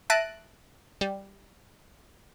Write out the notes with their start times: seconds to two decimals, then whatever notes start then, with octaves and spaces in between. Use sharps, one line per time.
0.10 E5 A5 F#6 A#6 D7 D#7
1.01 G3